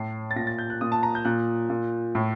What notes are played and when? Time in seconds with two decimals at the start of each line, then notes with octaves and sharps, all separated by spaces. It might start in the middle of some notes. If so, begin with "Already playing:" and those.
Already playing: A2 C7
0.31 A6
0.36 A#2 A#6
0.47 A6
0.58 G6
0.70 F#6
0.81 A#2 D#6
0.92 A5
1.03 A#5
1.15 G6
1.25 A#2 F#6
1.70 A#2
2.15 A2